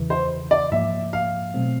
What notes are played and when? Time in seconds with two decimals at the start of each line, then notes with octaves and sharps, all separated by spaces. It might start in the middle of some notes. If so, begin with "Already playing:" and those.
Already playing: E2 C#3 E3
0.10 C5
0.51 D5
0.72 G#2 F3 A#3 E5
1.13 F5
1.54 B2 F#3 A3 C4